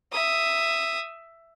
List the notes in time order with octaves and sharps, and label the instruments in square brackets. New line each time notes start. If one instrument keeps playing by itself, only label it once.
[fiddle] E5 D#6